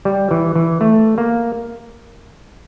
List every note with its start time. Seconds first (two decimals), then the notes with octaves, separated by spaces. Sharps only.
0.05 G3
0.31 E3
0.56 E3
0.81 A3
1.18 A#3